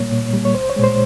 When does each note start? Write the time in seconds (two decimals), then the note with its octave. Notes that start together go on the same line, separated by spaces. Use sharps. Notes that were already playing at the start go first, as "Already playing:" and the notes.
Already playing: A#2 G3 A#3 C#5
0.11 A#2
0.33 G3 A#3
0.45 C#5
0.54 C2 C5
0.70 C#5
0.76 A#2 G#3
0.83 C5